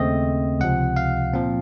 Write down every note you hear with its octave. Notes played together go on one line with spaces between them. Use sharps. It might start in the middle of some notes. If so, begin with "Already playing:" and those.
Already playing: D#2 C#3 A3 C4 D#5
C#2 C3 F3 F#5
F5
A#2 F3 C4